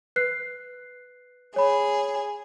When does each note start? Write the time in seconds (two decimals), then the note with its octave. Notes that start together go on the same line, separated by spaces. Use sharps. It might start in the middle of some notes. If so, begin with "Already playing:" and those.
0.16 B4 F#6 C7
1.56 G#4 C#5 B5